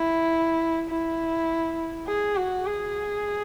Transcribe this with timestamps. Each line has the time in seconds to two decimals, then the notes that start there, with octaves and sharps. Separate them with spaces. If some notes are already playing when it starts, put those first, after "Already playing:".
Already playing: E4
0.90 E4
2.08 G#4
2.37 F#4
2.66 G#4